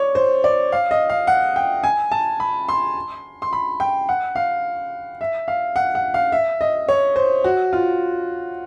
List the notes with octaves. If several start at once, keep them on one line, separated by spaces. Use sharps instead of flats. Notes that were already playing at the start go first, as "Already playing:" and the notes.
Already playing: C#5 D5
C5
D5
F5
D#5
F5
F#5
G5
G#5
A5
B5
C6
C6
B5
G5
F#5
F5
E5
F5
F#5
F#5
F5
E5
D#5
C#5
C5
F#4
F4